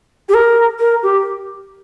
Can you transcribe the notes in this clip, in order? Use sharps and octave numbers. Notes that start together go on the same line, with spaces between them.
G4
A#4
A#4
G4